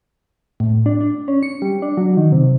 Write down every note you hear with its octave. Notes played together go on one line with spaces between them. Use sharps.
A2
D4
D4
C#4
C#7
G3
D4
F#3
D#3
C3